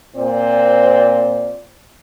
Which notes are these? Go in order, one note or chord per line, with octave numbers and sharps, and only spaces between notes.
A#2 C4 C5 D5